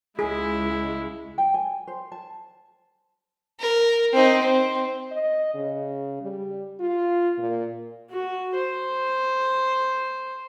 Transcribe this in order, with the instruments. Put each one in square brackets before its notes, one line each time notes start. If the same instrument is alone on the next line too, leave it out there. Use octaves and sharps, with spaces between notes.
[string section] C#2 G#3 [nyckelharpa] E4 [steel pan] G#4
[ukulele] G5
G#5
C5
A5
[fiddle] A#4
C4 D#4
C4
[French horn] D#5
C#3
G3
F4
A#2
[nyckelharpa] F#4
C5